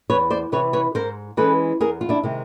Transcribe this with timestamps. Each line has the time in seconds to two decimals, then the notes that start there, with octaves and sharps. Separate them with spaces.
0.10 E2 B4 C#5
0.30 C5 D5
0.52 C3 E3 B4 C#5
0.73 B4 C#5
0.95 G#2 A#4 C5
1.37 E3 G#3 C#4 A4 B4
1.81 E2 G#4 A#4
2.01 F4
2.09 D4 E4
2.23 C3 D#3 G#3 C4